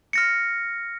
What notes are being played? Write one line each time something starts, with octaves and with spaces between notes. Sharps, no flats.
F6 A#6 C#7